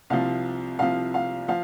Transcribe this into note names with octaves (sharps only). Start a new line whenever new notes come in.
C2 C3 F3 F5
C2 C3 F3 F5
F5
F3 F5